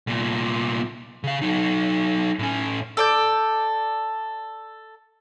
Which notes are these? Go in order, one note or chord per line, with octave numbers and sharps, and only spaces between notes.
C2 A#2
C#3 F5
F#3 D#4
A2 C#4
A4 D5 G6